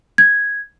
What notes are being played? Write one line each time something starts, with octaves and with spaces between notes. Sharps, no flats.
G#6